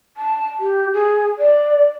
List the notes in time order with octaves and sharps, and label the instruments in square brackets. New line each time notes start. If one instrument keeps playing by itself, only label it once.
[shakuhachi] A5
G4
G#4
D5